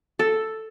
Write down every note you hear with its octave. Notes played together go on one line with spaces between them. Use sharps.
A4